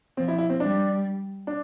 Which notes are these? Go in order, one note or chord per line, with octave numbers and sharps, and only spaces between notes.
F3 C4
E4
E4
C4
G3 D4
D4